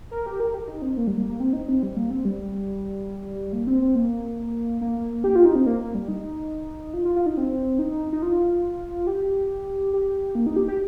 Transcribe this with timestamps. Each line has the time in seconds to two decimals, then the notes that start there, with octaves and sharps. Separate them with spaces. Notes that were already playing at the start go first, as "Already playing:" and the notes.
0.11 A#4
0.26 G4
0.40 A#4
0.54 G4
0.68 D#4
0.82 C4
0.97 A#3
1.07 G3
1.18 A#3
1.29 A#3
1.40 C4
1.53 D#4
1.68 C4
1.83 G3
1.97 A#3
2.10 C4
2.25 G3
3.53 A#3
3.67 C4
3.82 C4
3.95 A#3
4.81 A#3
5.24 G4
5.36 F4
5.45 D#4
5.55 C4
5.66 A#3
5.81 A#3
5.94 G3
6.08 D#4
6.94 F4
7.05 F4
7.16 F4
7.26 D#4
7.37 C4
7.79 D#4
8.13 D#4
8.22 F4
9.07 G4
9.93 G4
10.35 A#3
10.46 D#4
10.56 G4
10.68 G4